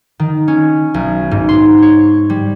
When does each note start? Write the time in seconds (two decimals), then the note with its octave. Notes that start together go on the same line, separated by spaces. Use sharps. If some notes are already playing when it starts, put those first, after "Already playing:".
0.19 D#3
0.48 C#4
0.94 B1
1.31 G#2
1.49 C6
1.82 C#5
2.30 G3